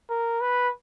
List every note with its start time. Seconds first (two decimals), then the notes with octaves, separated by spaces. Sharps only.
0.10 A#4
0.41 B4